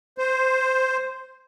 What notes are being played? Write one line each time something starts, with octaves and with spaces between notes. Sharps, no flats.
C5